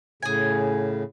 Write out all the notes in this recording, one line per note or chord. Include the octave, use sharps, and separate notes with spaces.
A2 C#3 G#4 G#5